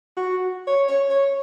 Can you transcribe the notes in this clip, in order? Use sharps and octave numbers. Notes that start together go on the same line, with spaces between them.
F#4
C#5
C#5
C#5